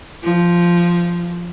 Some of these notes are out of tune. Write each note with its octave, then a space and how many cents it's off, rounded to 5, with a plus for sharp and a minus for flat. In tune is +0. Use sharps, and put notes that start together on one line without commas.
F3 -5